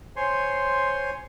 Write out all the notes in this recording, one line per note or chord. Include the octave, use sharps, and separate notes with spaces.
C5 C#5 G#5 C6